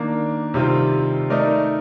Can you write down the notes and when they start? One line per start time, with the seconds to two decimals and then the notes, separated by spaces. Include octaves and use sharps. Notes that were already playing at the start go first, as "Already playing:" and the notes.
Already playing: D#3 A#3 D4
0.54 C3 D#3 G3 C4 F4
1.30 A3 D#4 A#4 D5